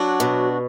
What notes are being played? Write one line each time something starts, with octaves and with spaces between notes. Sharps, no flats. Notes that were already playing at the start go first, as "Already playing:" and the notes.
Already playing: F#3 D4 F#4
B2